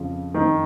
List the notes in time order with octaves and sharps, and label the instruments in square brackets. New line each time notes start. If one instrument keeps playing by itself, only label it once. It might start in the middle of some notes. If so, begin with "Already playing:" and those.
Already playing: [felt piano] F2 C#3 F3
[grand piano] D#3